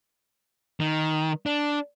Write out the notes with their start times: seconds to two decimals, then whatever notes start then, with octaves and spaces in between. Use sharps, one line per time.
0.80 D#3
1.46 D4